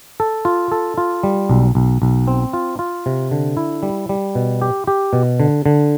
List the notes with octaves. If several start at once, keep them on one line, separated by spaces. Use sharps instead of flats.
A4
F4
A4
F4
G3
B1
B1
B1
C4
F4
F4
C3
D3
E4
G3
G3
B2
G4
G4
B2
D3
D3